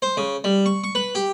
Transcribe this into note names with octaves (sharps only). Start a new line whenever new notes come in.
C5
C#3
G3
C#6
C#6
B4
G4